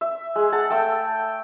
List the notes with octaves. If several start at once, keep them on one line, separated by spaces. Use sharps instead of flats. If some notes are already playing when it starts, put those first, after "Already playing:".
E5
G#3 G#4
F#5 A5
A3 G5 E6